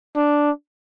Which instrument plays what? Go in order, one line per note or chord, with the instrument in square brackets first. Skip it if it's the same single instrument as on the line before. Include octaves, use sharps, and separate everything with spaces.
[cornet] D4